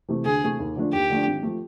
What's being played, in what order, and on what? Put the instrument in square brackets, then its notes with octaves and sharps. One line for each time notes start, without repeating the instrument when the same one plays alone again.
[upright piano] C3 E3 A3
[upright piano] D2 [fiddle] G#4
[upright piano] C3 E3 A3
D#2
D3 F3 A3 D4
[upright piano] D#2 [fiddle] G4
[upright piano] D3 F3 A3 D4
G#1
F3 A3